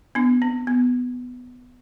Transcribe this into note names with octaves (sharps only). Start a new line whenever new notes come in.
B3 D4
C4
B3